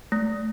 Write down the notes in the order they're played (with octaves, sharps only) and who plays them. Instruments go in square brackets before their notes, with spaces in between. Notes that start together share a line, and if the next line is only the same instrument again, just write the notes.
[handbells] A3